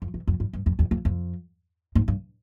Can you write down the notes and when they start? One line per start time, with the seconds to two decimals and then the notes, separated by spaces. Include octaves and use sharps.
0.02 F2
0.14 E2
0.27 F2
0.40 G2
0.53 G2
0.66 F2
0.79 E2
0.91 F2
1.05 F2
1.95 G#2
2.08 G2